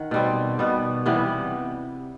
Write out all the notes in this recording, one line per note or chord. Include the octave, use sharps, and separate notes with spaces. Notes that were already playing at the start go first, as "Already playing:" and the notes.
Already playing: D#3 F#5
B2 G3 C4
B2 G3 B3
C3 E3 G3 B3